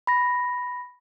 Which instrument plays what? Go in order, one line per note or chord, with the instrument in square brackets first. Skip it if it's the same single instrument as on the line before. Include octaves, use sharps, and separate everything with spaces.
[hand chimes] B5 A#6